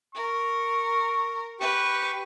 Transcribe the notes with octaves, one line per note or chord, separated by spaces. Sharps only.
A#4 C#6
G4 B4 C#6